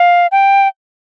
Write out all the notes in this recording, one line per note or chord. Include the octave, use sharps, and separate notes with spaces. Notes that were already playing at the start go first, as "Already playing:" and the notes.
Already playing: F5
G5